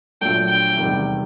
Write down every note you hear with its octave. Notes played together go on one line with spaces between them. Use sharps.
A#1 A#2 F#3 A3 D4 G5
G5
F1 E2 C3 D#3 G3